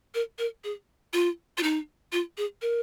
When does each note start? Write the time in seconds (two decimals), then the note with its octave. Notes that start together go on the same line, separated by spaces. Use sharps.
0.15 A#4
0.39 A#4
0.64 G#4
1.13 F4
1.58 F4
1.63 D#4
2.12 F4
2.38 G#4
2.62 A#4